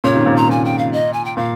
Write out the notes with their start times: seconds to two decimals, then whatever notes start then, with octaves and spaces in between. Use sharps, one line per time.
0.04 A#2 C#3 C#5
0.15 C3 D#3
0.26 A#2 C#3
0.37 A#2 A#5
0.48 A#2 G#5
0.65 G5
0.79 F5
0.93 D#5
1.13 G#5
1.25 G5
1.37 A#2 F5